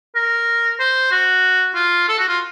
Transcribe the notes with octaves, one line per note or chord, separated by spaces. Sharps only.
A#4
C5
F#4
F4
A4
F#4
F4